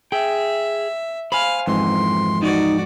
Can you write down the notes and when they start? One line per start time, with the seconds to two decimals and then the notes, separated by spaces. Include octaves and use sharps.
0.12 G#4 E5 G5
1.32 C5 F5 G#5 B5
1.67 F2 G#2 E3 C6
2.43 D#4 F#4 D5